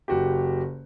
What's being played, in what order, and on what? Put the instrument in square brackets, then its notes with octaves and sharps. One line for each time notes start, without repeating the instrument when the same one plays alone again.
[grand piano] F#1 F#4 G4